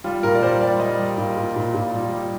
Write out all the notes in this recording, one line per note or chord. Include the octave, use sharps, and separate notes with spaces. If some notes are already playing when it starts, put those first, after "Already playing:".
G3 F4
A#2 A#4
D5
G3 C5
G3 D5
G3 D#5
G3
A#2
A#2
A#2
A#2
G3
G3